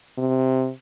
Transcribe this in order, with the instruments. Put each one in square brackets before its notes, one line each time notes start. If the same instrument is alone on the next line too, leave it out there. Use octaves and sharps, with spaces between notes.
[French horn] C3